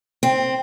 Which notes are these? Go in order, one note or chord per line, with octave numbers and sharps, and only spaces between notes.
C4